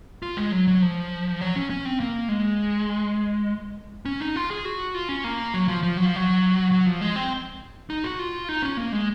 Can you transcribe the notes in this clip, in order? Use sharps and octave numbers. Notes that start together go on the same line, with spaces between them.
F4
G#3
F#3
F#3
F3
F#3
C#4
C#4
C4
A#3
G#3
C#4
D#4
F4
G#4
F#4
F4
C#4
A#3
F#3
F3
F3
F#3
F3
F#3
F#3
F3
G#3
C4
D#4
F#4
F4
D#4
C#4
A#3
G#3